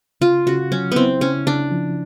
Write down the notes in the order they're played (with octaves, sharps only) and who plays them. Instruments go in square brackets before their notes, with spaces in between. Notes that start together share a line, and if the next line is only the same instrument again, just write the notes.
[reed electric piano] C#3 [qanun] F4
[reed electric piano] C#3 [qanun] F#4
[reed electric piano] F#3 [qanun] C#4
[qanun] B3 C4 [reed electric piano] E4
[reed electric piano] C#3 [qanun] C#4
[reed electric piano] C#3 [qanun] D4
[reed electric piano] F3